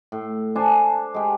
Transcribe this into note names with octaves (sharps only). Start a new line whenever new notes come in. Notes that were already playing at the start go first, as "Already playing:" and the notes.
A2
D4 C5 G#5 A5
G#3 G4